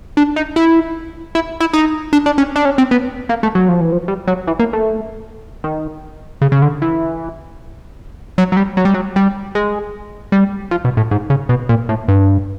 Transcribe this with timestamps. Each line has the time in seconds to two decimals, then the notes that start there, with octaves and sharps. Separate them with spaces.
0.17 D4
0.36 D#4
0.56 E4
1.35 E4
1.60 E4
1.73 D#4
2.13 D4
2.26 D4
2.38 C#4
2.56 D4
2.65 C#4
2.78 C4
2.91 B3
3.29 A#3
3.43 A3
3.55 F#3
3.69 F3
3.81 E3
3.93 F3
4.08 G3
4.28 F#3
4.47 E3
4.59 A#3
4.73 A3
5.64 D#3
6.42 C#3
6.52 C#3
6.62 D3
6.82 E3
8.38 F#3
8.52 F#3
8.57 G3
8.77 F#3
8.85 G3
8.94 F#3
9.16 G3
9.55 G#3
10.32 G3
10.71 F3
10.85 B2
10.97 A2
11.11 G#2
11.30 C#3
11.49 B2
11.69 A#2
11.89 A2
12.08 G2